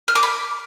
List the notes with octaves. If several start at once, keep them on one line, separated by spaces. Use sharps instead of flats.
F6
D6
B5